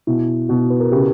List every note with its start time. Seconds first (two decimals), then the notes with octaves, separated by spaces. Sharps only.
0.07 B2 E4
0.49 B2 F#4
0.70 B4
0.80 A#4
0.92 C#3 G4